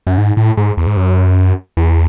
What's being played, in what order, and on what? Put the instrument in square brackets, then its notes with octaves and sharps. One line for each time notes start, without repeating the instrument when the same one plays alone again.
[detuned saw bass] F#2
G#2
A2
G#2
E2
G#2
F#2
E2